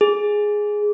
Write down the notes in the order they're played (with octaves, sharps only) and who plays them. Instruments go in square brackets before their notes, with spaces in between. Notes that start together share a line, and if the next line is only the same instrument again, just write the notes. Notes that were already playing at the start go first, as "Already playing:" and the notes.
[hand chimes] G#4